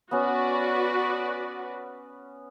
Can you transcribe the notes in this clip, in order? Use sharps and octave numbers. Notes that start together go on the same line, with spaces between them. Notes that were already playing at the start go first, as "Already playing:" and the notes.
B3 C#4 F#4 B4 D5